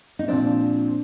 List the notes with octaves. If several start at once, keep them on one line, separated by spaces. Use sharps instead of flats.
D#4
A#2 F3 C4 D4